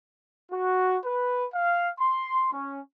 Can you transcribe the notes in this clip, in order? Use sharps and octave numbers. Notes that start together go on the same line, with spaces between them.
F#4
B4
F5
C6
C#4